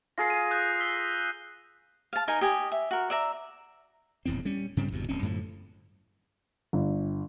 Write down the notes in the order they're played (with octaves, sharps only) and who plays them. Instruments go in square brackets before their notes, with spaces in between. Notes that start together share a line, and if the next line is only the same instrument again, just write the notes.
[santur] F4 G#4 A#4 [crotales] A#6 C7
[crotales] D#7
D#6 F#6 G6
E6 B6 G7
[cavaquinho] F5 A5
D#4 A#4 G#5
G4 D#5 G#5
E5
F#4 A#4
D5 E5 A#5
[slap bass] D#1 E2 A2 C4
G3 C#4
G2 C#3 G3 C4
G1 E2 G2 B2
D1 C4 C#4
F#2 A2 D3 F3
[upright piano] G1